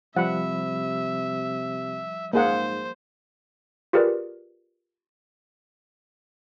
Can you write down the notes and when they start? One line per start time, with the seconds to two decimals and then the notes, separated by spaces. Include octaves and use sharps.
0.16 C3 F3 G3 E5 F#5 B5
2.33 G#2 A#3 G#4 C5 F#5
3.93 F4 G4 G#4 A#4 B4 D5